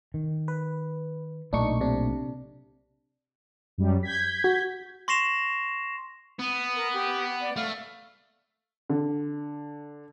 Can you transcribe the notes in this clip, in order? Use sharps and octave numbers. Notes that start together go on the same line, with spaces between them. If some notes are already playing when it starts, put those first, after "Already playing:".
D#3
B4
B1 A#2 A3 D4 D#4 C#6
C3 D4
F#2 G3
G6 G#6 B6
F#4
C6 C#6 A#6 C7 E7 F7
B3
A#4
G4
D5
A3 F5
D3